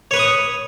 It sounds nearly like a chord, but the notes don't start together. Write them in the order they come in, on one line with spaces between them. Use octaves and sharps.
C#5 B4 C#6 D#6